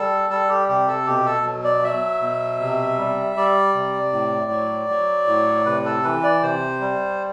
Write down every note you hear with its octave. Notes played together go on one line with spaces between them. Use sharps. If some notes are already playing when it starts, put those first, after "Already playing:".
Already playing: G3 A4
G3 A4
G4
C3 G4
A4
B2 G4
A4
F#3
D5
F#3 E5
B2
C3
G3
G3 D5
C3
A2
F#3
F#3
A2
C3 B4
A4
E3 B4
D5
C3 C5
G3